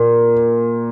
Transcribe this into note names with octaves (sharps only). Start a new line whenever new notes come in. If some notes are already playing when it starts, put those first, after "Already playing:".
Already playing: A#2